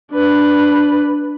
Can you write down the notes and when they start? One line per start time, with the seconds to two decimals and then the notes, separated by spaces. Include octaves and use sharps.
0.13 D4 B4